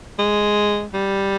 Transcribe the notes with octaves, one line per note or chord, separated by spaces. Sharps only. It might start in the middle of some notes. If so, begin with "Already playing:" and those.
G#3
G3